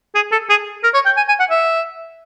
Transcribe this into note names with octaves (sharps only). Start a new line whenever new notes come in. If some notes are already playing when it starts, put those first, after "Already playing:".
G#4
A4
G#4
A#4
C#5
G5
G#5
G#5
F#5
E5